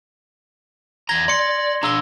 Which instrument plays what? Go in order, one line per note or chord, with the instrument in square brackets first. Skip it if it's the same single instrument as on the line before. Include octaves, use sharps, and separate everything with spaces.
[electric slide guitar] E2 A#5 [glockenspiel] G#6 A#6 G7
[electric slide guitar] D5 [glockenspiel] C6 C#7
[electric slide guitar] D4 G#4 [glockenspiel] A#5 E6 G7